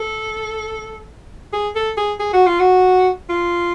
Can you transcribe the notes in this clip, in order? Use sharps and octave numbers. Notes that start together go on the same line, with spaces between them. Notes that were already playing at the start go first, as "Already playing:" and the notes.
Already playing: A4
G#4
A4
G#4
G#4
F#4
F4
F#4
F4